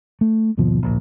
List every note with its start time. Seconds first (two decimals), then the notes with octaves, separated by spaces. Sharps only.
0.21 A3
0.57 G#1 D#2 B2 F3
0.83 D1 A#1